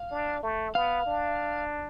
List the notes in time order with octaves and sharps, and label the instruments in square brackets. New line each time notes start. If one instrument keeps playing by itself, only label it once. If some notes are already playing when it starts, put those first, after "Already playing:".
Already playing: [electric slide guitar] F5
[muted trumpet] D4
A3
[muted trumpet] B3 [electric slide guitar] F5
[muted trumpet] D4